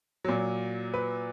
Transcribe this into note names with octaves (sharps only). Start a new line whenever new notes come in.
A#2 F#3
B4